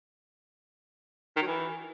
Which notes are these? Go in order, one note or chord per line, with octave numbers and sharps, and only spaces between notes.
D#3
F#3
E3